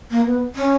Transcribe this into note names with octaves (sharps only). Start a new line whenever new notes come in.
A#3
B3
C#4